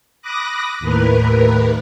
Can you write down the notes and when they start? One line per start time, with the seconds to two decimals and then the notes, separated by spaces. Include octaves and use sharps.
0.22 B5 D6 D#6 F#6 A#6
0.80 D#2 A2 A#4 B4